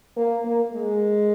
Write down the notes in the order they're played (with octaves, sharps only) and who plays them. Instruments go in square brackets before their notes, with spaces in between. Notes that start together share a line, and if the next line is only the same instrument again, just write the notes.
[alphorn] A#3
A#3
G#3